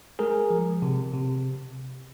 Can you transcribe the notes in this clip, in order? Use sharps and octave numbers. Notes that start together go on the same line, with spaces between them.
G#3 G#4 A#4
F3
C3
C3